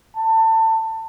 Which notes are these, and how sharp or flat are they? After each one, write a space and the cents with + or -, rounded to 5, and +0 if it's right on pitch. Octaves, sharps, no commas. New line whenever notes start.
A5 +25